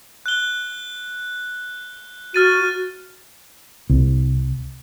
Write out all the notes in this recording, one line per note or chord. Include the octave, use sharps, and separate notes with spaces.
F#6 G7
F#4 F6 A6 D#7
C2